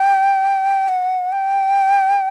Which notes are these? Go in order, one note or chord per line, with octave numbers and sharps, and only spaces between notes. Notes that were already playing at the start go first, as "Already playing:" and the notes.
Already playing: G5
F#5
G5